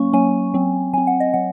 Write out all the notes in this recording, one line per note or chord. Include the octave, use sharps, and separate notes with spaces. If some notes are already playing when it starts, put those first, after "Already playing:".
Already playing: F#3 A#3 C#4 C#6
F#3 A#3 C#4 G#5
F#3 C4
F#3 C4 G#5
F#5
D#5
F#3 F#5